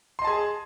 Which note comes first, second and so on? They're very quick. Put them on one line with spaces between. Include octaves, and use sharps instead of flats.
C6 D#5 A5 G#4